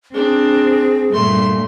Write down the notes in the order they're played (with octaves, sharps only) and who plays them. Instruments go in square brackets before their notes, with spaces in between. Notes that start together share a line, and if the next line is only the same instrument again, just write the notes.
[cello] C4 [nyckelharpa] D4 [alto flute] G#4
[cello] G2 A#2 [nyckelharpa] A3 C6